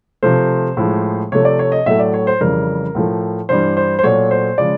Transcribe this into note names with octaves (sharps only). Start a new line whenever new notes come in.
C3 F3 A3 C5
A2 F3 G#3
C3 F3 A3 C#5
D5
C#5
D#5
A2 F#3 A3 E5
D5
C#5
C5
F2 C#3 E3 G3 A#4
A2 F3 A3
G2 E3 G3 C5
C5
C5
A#2 F#3 A3 C#5
C5
C#3 F3 G#3 D5